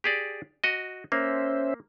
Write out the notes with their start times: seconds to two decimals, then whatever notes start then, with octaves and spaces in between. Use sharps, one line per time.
0.04 G4 G#4 D5
0.64 F#4 D#5
1.12 A#3 C#4 C5 E5